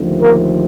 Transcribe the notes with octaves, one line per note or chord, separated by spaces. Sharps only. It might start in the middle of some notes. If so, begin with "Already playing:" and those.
Already playing: D#2 D3 F3 A3 C4
A#3 A#4